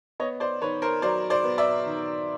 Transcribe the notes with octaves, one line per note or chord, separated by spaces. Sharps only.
B3 C#5 D#5
C5 D5
D#3 B4 C#5
A#4 C5
F#3 C5 D5
C5 D5
B3
D5 E5
D#3